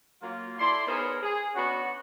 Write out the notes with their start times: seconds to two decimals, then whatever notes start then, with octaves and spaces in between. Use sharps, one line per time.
0.22 F#3 A#3 F4
0.58 E4 A4 D5 C6
0.87 B3 D#4 G#4 A#4 C5 C#5
1.22 G#4
1.55 B3 C#4 D4 F#4